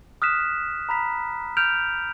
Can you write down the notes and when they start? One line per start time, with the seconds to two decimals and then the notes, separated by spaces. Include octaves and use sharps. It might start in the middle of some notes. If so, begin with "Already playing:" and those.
0.22 D#6 F6 F#6 B6 E7
0.89 A#5 B5 B6
1.57 F6 G6 D7 F7